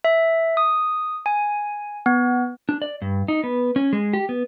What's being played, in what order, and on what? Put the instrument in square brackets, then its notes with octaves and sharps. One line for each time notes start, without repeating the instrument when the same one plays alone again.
[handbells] E5
D#6
G#5
B3
[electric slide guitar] D4
D5
G2
D#4
B3
C#4
G#3
G4
B3